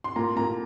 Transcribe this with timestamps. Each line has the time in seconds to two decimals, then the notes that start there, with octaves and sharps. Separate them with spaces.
0.04 C6
0.16 A#2 A#5
0.36 A#2 A#5